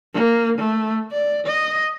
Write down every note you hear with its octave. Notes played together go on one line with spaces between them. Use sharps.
A#3
A3
D5
D#5